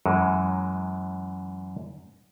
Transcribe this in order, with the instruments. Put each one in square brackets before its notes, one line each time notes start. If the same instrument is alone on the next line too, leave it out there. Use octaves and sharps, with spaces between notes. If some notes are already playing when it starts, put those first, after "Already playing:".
[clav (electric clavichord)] F#2 E3 G#3